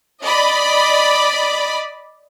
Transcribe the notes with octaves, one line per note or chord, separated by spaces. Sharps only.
D5 D#5 B5